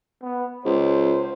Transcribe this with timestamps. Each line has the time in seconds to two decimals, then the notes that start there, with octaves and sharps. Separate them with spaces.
0.22 B3
0.65 C#2 C5